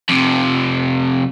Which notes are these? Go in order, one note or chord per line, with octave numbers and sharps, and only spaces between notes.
F2 C3